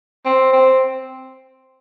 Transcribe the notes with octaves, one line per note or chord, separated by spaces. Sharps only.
C4
C4